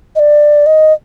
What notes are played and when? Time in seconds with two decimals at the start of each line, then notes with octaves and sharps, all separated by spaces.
0.16 D#5
0.19 D5
0.66 D#5